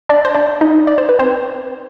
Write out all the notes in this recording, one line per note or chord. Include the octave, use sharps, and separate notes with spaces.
D4 D5
C5
D4 D5
D#4 D#5
D5
C5
B4
C4 C5